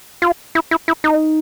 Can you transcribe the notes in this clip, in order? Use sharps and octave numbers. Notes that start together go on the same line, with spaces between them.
F4
E4
E4
E4
D#4